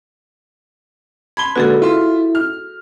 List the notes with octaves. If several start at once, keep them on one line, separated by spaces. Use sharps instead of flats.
A5 B5 C6 G#6 G7
A#2 D3 G#3 F#4 G#4 A4 B4
E4 F4 E5 C6
F6